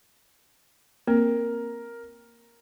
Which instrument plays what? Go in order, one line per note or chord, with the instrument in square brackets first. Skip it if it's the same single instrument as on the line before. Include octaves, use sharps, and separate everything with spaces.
[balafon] A#3 C4 [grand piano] A#4